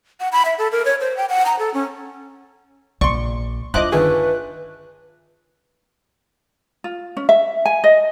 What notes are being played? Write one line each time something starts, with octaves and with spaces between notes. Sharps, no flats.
F#5
B5
E5
A4
A#4
C#5
C5
G5
F#5
A#5
A4
C#4
A#1 D5 C6 C#6
A3 D4 E4 F4 C5 D#5 D6 F#6
G1 D#3 A3 A#3 C#4 G#4 B4
F4
C#4
E5
G#5
D#5